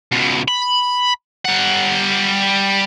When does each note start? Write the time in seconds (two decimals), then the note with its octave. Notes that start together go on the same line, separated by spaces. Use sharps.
0.12 C#2 B2
0.48 B5
1.45 G3 F#5